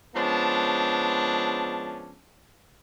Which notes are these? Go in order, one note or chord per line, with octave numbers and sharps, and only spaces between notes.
F3 G#3 B3 C#4 D4 A5